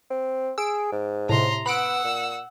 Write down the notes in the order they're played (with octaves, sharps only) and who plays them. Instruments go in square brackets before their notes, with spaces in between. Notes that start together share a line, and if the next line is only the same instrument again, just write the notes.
[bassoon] C4
[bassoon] G#4 [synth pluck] E6 D7
[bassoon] G#2
[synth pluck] A2 C3 [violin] A#5 C6
[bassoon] B3 [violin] F#5 E6 [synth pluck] B5 F#6 D7
[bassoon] A#2